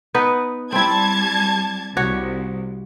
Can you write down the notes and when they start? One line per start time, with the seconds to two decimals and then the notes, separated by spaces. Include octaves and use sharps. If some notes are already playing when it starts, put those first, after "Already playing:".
0.14 B3 D#4 B4
0.73 G3 C4 E4 A5 G#6
1.97 C2 F#4 C#5